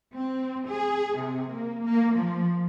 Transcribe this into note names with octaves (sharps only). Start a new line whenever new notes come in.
C4
G#4
C3
A#3
A#3
F3